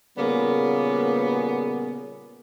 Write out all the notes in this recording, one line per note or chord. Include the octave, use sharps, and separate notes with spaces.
A#2 C#3 G3 A#3 B3